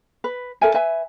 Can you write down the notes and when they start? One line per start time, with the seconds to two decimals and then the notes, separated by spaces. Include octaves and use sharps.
0.24 B4
0.61 A4 A#4 E5 G#5
0.74 B4 E5 G#5